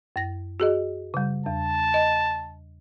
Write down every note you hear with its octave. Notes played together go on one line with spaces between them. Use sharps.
F#2 A#6
F#4 G#4 D#5
C#3 G3
E2 A5
D#5